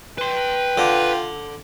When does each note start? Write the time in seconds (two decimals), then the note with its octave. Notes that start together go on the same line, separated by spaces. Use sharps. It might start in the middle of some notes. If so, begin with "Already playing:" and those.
0.18 B4 G5 C6
0.78 D3 F4